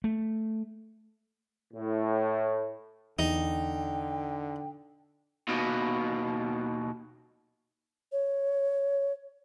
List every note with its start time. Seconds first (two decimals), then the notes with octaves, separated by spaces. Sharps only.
0.04 A3
1.74 A2
3.19 E2 D3 D#4 G5
5.48 D#2 B2
8.12 C#5